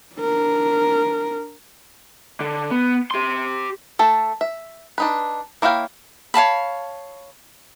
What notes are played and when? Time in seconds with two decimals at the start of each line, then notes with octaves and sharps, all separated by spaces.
0.16 D4 A#4
2.40 D3
2.71 B3
3.11 G4 C6
3.99 A3 A4
4.41 E5
4.98 D4 D#4 B4
5.62 A#3 E4 C#5 F5 G5
6.34 C#5 F5 A5 B5